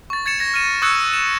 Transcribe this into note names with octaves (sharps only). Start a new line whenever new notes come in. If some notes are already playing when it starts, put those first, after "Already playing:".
C#6 A6
G#6 A6 C#7 E7
G#6 A#6 E7
F6 A#6 D#7 E7
C#6 D#6 E6 F#6 G#6 C#7
E7